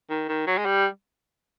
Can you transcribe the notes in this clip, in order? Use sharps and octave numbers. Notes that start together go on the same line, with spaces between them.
D#3
D#3
F#3
G#3
G3